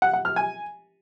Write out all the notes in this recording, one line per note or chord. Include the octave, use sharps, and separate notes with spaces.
F#5
F#5
F6
G#5